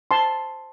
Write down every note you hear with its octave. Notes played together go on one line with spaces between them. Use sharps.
C5 A5 C6